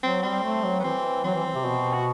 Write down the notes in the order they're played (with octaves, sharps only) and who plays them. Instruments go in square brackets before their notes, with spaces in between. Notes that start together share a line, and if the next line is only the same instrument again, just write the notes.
[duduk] F#3 [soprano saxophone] C4
[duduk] G3 [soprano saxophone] C4
[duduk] A3
F#3
[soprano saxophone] B3
[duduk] E3 [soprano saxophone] C4
[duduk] F#3 [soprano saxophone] C4
[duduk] E3
C3
B2
[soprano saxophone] F#4